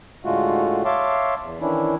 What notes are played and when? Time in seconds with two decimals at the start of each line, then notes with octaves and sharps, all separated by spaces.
0.25 A2 D3 G#3 A3 F4 F#4
0.85 C#5 E5 F5 A5 C6 D6
1.40 E2
1.61 D#3 E3 C#4 D4 E4